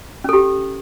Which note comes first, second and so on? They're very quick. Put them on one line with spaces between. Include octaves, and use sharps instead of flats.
C#4 A4 G4